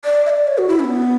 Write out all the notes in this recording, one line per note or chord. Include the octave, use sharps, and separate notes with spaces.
D5
E5
D5
C#5
F#4
E4
C#4
B3